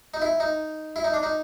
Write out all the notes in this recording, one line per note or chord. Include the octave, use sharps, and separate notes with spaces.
D#4
E4
D#4
E4
D#4
D4
D#4